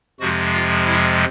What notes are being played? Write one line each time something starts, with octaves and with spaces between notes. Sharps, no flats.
F2 C3 F3 G#3 F#4
F4
E4